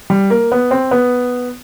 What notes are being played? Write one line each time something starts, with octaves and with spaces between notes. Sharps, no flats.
G3
A#3
B3
C4
B3